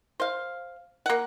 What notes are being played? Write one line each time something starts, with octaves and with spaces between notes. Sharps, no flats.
C5 F5
A#3 F#5